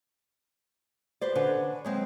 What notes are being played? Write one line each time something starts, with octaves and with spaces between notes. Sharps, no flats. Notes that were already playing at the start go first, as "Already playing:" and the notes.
F#4 G4 B4 C5 D5
D3 C#4 D4 B4 C5 D5
F#3 G#3 C4